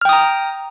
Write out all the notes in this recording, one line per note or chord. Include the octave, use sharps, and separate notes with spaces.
G5 A#5 D#6 F6